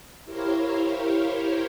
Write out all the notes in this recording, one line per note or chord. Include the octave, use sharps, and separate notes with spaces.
E4 G4 A#4 C5 C#5 F5